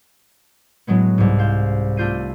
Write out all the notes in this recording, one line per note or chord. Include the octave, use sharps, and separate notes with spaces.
A2 F#3 G#3 B3
C2 G#2
C5 F5
A3 D4 F4 G6 C7 D#7